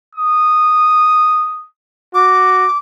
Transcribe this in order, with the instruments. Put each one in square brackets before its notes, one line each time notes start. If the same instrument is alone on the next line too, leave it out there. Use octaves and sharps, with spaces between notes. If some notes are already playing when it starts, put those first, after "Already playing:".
[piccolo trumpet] D#6
[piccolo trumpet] F#4 [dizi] D6